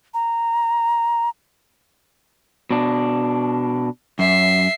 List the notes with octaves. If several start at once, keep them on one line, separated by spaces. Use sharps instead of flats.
A#5
B2 D4
F#2 E5 C7